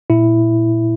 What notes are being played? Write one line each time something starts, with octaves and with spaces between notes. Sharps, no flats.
A#2 E4